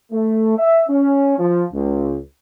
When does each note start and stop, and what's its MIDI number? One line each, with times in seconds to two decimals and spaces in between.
0.12 0.58 57
0.58 0.83 76
0.89 1.38 61
1.39 1.64 53
1.73 2.18 37